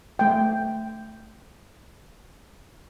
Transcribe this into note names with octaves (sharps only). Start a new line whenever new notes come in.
A3 G5